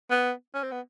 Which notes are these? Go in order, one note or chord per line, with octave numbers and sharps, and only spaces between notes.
B3
C#4
C4
B3